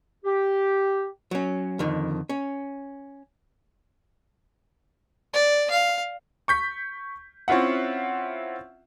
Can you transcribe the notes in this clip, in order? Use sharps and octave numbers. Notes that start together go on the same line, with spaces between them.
G4
F#3 C#4
F2 D3 D#3
C#4
D5
F5
C#6 G6 B6
C4 C#4 E4 F4 E5 F#5